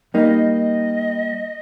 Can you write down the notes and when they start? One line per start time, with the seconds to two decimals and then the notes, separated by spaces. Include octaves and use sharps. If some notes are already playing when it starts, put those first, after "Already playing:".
0.14 G3 A#3 D#4 D#5